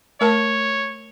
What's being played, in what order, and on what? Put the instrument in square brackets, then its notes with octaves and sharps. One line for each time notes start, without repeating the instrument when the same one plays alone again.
[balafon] A3 A#4 A5 [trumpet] C#5